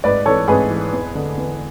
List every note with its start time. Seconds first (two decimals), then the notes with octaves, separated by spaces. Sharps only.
0.04 G#2 B4 D5
0.26 E3 A4 C#5
0.48 G#2 G#4 B4
0.70 E3
0.93 E2
1.15 D3
1.37 E2